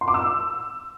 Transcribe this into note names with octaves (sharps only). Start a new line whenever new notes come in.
C6
D6
E6